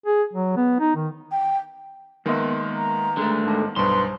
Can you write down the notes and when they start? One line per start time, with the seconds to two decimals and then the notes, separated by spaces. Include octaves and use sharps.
0.06 G#4
0.33 F#3
0.57 B3
0.80 D#4
0.96 D#3
1.32 G5
2.26 D#3 G#3 A#3 B3 D#5 E5
2.77 A#5
3.17 D3 G#3 A3
3.43 G#2 G#3 A5
3.76 B1 G2 G3 B4 C5 C6